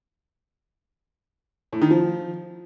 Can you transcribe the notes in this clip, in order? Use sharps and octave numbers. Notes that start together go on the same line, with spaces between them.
A2
D#3
F3